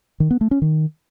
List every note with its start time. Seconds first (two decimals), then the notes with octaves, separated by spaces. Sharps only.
0.20 D#3
0.31 B3
0.41 A3
0.51 C#4
0.62 D#3